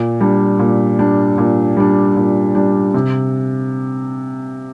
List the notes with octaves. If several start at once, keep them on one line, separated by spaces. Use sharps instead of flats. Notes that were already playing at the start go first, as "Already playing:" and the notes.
Already playing: A#2
G3 D4
A#2
G3 D4
A#2
G3 D4
A#2
G3 D4
C3